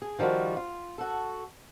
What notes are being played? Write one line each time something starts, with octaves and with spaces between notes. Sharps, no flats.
G#4
D#3 F3 G3 F4 F#4
F4
F#4 A4